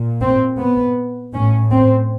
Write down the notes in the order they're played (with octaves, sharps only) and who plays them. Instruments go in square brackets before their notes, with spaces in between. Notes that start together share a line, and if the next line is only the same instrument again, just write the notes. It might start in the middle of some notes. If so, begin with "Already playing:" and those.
Already playing: [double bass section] A#2
C4
B3
A2 C#4
C4